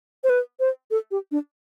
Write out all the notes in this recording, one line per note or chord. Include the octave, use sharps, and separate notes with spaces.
C5
B4
C5
A4
G4
D4